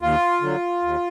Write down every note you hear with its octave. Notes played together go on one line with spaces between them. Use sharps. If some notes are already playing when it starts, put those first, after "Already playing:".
D#2 F4
D3 F#3
D#2